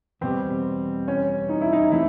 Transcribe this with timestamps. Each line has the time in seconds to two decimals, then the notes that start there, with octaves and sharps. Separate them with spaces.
0.21 E2 B2 G3 C4
1.08 C#4
1.49 D#4
1.61 E4
1.73 D#4
1.92 E3 A3 C4 E4